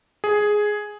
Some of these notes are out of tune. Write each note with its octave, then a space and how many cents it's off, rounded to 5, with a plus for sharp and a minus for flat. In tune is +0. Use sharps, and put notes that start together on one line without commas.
G#4 +5